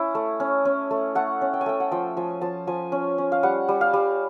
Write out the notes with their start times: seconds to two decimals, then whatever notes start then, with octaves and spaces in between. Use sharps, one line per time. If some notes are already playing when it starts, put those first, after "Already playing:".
Already playing: C#4 E4
0.15 A3
0.40 C#4
0.65 C#4
0.91 A3
1.15 A3 F#5
1.41 C#4
1.54 G5
1.61 G#5
1.66 A3 G5
1.80 F#5
1.91 F3 G5
2.17 F3 G#5
2.41 F3 A5
2.67 F3 G#5
2.92 C#4
3.18 C#4
3.32 F5
3.43 G3 F#5
3.68 G3
3.81 F5
3.93 G3